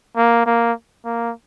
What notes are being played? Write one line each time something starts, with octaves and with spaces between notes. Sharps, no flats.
A#3
A#3
A#3